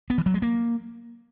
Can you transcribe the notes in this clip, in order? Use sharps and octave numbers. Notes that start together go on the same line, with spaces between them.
B3
E3
F#3
G#3
A#3